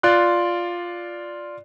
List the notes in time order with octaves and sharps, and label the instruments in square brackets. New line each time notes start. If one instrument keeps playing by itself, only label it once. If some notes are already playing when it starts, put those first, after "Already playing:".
[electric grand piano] F4 D5 C6 F#6